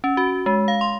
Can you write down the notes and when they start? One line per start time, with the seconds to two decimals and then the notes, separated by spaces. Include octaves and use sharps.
0.04 C#4
0.17 F#4
0.46 G#3
0.68 F5
0.81 C6